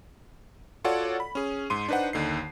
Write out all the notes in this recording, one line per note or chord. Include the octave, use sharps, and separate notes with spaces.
F4 F#4 A4 C#5 D5 F#5
B5
C#4 G#4
G#2 C6 D#7
D4 D#4 B4 C5 F#5
D#2 D3 D#4 C7